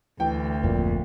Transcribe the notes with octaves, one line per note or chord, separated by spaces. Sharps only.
D2 E3 G5
F#1 F2 A#2 F3